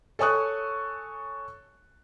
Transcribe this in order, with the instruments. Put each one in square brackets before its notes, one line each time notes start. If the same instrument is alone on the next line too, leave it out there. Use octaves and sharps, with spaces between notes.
[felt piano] A4 C#5 G#5 C#6 D#6 F#6